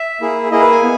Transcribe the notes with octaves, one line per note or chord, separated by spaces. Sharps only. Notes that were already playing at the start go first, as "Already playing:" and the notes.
Already playing: E5
A#3 E4 G#4
A#3 E4 G#4 D#5
B4
G#5
B3